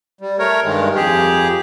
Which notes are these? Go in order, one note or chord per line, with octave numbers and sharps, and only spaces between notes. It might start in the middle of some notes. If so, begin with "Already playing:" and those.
G3
A3 A#4 C#5
G2 D#3 G#3
F2 G4 G#4